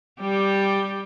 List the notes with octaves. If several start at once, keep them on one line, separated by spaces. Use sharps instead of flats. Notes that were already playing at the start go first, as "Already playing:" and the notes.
G3 G4